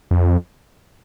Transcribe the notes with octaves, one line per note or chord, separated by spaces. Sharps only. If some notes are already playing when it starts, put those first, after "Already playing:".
F2